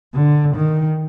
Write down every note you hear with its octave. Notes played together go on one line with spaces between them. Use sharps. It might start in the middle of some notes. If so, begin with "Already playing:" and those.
D3
D#3